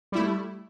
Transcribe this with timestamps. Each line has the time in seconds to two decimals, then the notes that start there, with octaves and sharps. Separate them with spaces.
0.12 G3
0.15 E4
0.18 A3